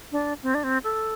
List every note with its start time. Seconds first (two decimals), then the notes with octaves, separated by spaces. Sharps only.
0.12 D4
0.43 C4
0.54 D4
0.64 C4
0.84 A4